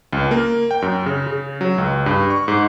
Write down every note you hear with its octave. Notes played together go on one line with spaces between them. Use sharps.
C#2
A#3
G5
F#2
C#3
C#3
F#3
C#2
G2
C#6
G#2